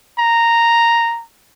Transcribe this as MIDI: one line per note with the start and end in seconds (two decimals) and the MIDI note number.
0.19 1.23 82